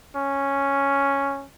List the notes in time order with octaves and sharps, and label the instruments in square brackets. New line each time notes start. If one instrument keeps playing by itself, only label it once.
[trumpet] C#4